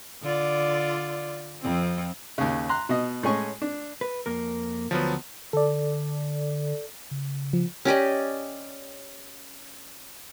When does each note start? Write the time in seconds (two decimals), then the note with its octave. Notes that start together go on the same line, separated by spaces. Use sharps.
0.22 D3 F4 D5
1.61 F2 C4
2.38 D#2 C#3
2.69 A#5 C6 F#6
2.89 B2 D#5
3.23 A2 G#3 C#4 G#5 C#6
3.62 D4
4.01 B4
4.26 F2 A#3 A#4
4.91 D2 F3 F#3 B3
5.53 D3 A4 D5
7.11 C#3
7.53 F3
7.85 C#4 G4 D5 D#5